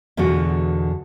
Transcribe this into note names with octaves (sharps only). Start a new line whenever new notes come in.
E2 B2 D3 F4 F#4